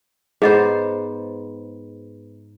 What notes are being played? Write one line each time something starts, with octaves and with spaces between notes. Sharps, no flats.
G#2 B3 G#4 C5 D#5